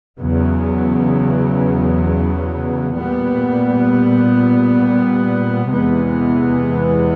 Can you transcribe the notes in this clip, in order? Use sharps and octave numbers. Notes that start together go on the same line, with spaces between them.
E2 C#3 F#3 B3
A#2 G3 B3
E2 C3 E3 G#3 B3